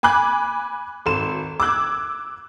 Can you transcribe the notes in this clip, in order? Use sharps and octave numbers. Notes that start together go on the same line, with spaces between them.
G#5 B5 D6 F#6
G#1 A4 C6 E7
D6 E6 F#6 G#6